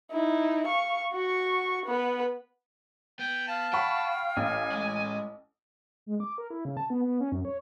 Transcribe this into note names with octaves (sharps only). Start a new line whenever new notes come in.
D#4 E4
F5 C#6
F#4 C#6
B3 B4
B3 G5
F5 A5
F#5 G5 B5 C#6
A1 G#5
G#3
G#3
D6
A#4
E4
C#3
A5
B3
B3
C#4
F#2
C#5